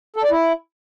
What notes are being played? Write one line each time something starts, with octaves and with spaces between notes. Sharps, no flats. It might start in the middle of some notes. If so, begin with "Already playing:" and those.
A4
D5
E4